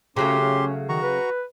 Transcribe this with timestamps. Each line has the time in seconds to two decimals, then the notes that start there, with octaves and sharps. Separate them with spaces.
0.17 C#3 F#3 A3 C#4 G4 C6
0.39 C#4
0.89 D#3 F#4 A#5 C#6
1.03 B4